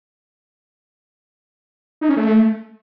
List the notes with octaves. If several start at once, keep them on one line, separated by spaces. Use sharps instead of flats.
D#4
C#4
A3